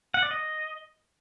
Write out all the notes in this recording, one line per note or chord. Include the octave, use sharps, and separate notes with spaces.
F#5
D5
D#5